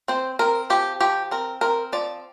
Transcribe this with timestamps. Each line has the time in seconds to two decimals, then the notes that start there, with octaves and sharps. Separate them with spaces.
0.08 C4 C5
0.39 C4 A#4
0.70 F3 G4
1.01 F3 G4
1.31 C4 A#4
1.61 C4 A#4
1.93 F3 D5